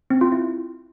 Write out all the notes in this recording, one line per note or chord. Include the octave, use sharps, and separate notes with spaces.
C4
F4
E4